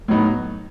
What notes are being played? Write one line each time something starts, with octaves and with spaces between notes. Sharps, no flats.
A2 F#3 B3 D#4